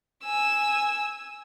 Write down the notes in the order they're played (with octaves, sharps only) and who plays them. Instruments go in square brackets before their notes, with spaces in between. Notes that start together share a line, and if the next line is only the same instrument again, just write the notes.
[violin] G#5 E6